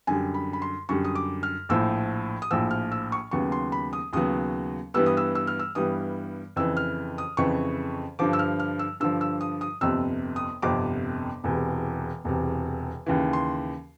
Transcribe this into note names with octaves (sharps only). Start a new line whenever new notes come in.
F#2 D3 G3 G#5
B5
B5
C6
F#2 D3 G3 C#6
D#6
D6
F6
A#1 A2 F3 E6
D#6
A#1 A2 F3 E6
F6
E6
C#6
D#2 C#3 F#3 B3 C#6
C6
B5
D#6
D#2 C#3 F#3 B3 D#6
G2 E3 G3 B3 E6
D#6
E6
E6
F6
E6
G2 E3 G3 B3 D#6
F2 C#3 E3 E6
F6
D#6
F2 C#3 E3 C#6
G2 D3 F3 D6
E6
F6
F6
E6
G2 D3 F3 E6
E6
D#6
D#6
G1 F2 C3 E6
D#6
G1 F2 C3 D6
E1 E2 C3
E1 E2 C3
D#2 C#3 E3
C6